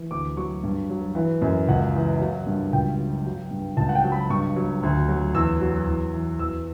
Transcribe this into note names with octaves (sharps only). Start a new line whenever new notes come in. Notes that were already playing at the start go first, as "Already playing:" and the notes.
Already playing: E3
D2 D6
F#3 C#6
G2
F#3
E3
F#2
C#2 F#5
E3
F#3
G2
C#2 G5
F#3
F#3
G2
C#2 A5
F#5
G5
F#3
B5
G2 C#6
F#3
D2
F#3
E2 E6
F#3
E2
E3
E2 E6